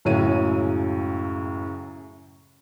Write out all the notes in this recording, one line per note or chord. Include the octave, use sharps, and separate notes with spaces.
C#2 F#2 A2 C#3 C#5 D#7